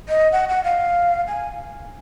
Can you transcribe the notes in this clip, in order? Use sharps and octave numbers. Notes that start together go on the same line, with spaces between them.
D#5
F#5
F#5
F5
G#5